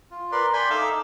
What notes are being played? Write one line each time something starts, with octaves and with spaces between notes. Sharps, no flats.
F4
A#4 B4 D5 C6
D5 G5 G#5 B5 C6
D#4 A4 E5 F5 D6 E6